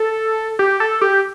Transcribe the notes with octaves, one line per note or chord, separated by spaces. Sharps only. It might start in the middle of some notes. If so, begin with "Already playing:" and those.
Already playing: A4
G4
A4
G4